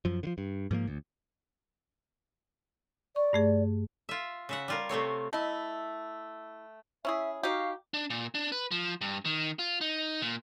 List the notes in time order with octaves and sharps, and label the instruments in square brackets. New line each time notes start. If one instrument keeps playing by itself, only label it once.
[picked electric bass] F#2 F3
D3 F3
G2
G#2 F3 A3 A#3
D2
[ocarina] D5 [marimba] C#6
[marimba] G2 A3 G#4
[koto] F4 E5
C#3 E5 F#5
G3 F4 A#4
C3 A3 C4 C#5
[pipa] A3 [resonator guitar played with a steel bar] E4 D#5
[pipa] C#4 E4 G#4 [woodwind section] E5
[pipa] D#4 G4 [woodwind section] F#4 F5
[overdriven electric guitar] D4
A#2
D4
B4
F3
G2
D#3
F4
D#4
A#2